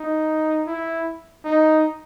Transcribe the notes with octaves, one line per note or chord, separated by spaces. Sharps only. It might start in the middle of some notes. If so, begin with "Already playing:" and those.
Already playing: D#4
E4
D#4